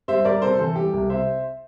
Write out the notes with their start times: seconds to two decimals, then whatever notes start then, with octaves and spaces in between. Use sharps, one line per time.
0.08 G3 C5 E5
0.25 G3 A#4 D5
0.42 C3 A4 C5
0.59 E3 A4
0.76 G3 G4
0.94 C2
1.10 C3 C5 E5